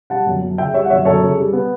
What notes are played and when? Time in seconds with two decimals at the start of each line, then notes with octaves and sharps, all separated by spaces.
0.10 G3 F#5 A5
0.27 F#2
0.42 F#2
0.58 C#3 E5 G5
0.74 G3 C#5 E5
0.85 F#5
0.90 F#2 C#5 E5
1.05 F#2 A4 C#5
1.22 C#3
1.38 G3
1.53 B3